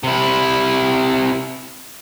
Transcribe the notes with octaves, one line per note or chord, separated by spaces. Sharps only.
C3 E4